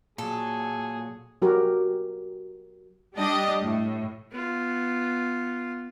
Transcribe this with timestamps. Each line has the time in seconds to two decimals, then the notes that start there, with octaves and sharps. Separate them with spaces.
0.18 A#2 F#3 G#4 A4
1.42 F#3 F#4 G4 A#4
3.16 G3 D4 G4 D#5
3.63 A2
4.31 B3 F4